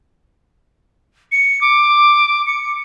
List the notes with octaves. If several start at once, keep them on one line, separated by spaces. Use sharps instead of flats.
C#7
D6
C#7